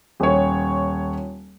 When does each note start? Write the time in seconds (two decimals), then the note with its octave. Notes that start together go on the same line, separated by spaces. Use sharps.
0.20 D#1 C#5